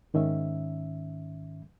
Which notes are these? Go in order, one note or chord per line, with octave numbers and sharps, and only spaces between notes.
G#2 D#3 C#4 E5